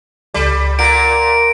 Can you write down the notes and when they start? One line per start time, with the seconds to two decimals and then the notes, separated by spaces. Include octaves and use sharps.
0.34 C#2 G3 A4 D5
0.79 A#2 F#5 A#5 D7